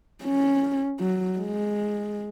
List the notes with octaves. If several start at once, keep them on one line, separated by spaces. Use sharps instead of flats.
C#4
F#3
G#3